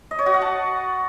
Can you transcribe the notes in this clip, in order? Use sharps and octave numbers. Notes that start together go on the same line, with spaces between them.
D#5
C#5
F#4
F#5
A5